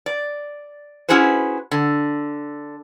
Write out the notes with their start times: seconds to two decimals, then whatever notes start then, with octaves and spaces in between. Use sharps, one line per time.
0.06 D5
1.09 C#4 E4 F#4 G#4 B4 C5
1.71 D3